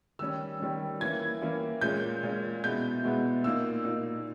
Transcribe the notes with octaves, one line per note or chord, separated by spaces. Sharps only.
D#3 G3 C#4 E6
D#3 G3 C#4
E3 A#3 C#4 E4 G#6
E3 A#3 C#4 E4
A#2 G#3 C#4 G6
A#2 G#3 C#4
B2 G#3 B3 E4 G6
B2 G#3 B3 E4
A#2 A#3 D#4 E6
A#2 A#3 D#4